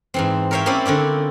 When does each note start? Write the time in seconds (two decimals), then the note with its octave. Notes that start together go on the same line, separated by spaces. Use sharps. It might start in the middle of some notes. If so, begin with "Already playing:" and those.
0.14 G#2 E3 C4
0.51 A#4 C5 C#5 E5 F5 G5
0.66 A#3 C4 C#4 E4 C5 D5
0.86 D3 C4 C#4 D5